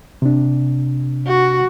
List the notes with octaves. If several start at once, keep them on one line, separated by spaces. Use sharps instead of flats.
C3 D4
F#4